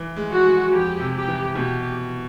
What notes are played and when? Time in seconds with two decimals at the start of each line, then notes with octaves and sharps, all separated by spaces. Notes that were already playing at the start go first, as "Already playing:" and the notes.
Already playing: E3
0.16 G#3
0.30 F#4
0.44 G#3
0.72 F2 G4
1.00 C3
1.14 G4
1.27 E3
1.55 B2 G4